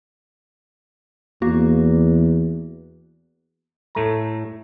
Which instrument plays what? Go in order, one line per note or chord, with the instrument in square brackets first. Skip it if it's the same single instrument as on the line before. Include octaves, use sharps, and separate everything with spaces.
[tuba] E2 [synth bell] A#3 F#4
[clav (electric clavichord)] A2 A3 A#5